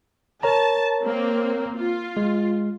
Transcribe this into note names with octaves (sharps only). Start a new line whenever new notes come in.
A#4 C#5 A5 A#5
A#3 C4
F4
G#3